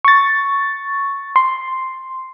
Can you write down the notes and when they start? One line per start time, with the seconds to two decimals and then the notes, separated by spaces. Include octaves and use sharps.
0.05 C#6 A6
1.36 C6